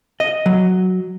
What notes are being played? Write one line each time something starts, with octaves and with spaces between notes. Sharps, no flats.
D#5
F#3